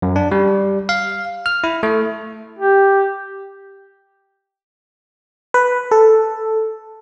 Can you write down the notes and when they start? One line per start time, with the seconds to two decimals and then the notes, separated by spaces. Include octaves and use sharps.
0.02 F#2
0.16 D4
0.32 G3
0.89 F5
1.46 F6
1.64 E4
1.83 A3
2.59 G4
5.54 B4
5.91 A4